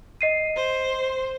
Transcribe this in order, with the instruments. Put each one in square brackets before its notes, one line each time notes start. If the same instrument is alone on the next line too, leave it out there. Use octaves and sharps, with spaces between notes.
[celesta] D#5 C7 D#7
[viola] C5